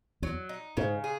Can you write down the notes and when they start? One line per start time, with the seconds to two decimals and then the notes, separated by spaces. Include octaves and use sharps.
0.22 E2 F#3
0.49 D#4
0.77 G#2 C#3
1.04 G#4